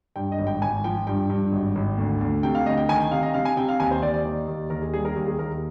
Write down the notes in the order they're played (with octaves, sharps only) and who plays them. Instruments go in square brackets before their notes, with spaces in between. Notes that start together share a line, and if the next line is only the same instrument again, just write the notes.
[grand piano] G2 G5
D#5
G#1
G5
G#1 G#5
F3 G5
G2 G5
G2
G#1
G#1
D2
D2
C3 G5
F5
D2 D#5
G5
D#3 G#5
G5
C3 F5
D#5
C3 F5
G#5
C3 G5
F5
D#2 G#5
C5
D#2 D5
D5
D#3
D#2
D#2 A#4
G#4
G3 G#4
A#4
D#2 G#4
G#4
D#2 A#4